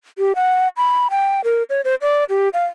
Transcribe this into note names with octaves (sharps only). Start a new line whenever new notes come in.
G4
F#5
B5
G5
A#4
C#5
C5
D5
G4
F5